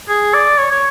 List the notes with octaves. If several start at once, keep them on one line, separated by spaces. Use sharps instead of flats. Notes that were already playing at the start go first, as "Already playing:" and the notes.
G#4
D5
C#5
C#5